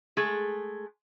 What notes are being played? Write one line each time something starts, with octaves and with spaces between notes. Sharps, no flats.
G#3 A3 G#4